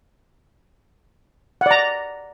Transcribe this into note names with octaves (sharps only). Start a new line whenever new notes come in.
D5 F#5 A#5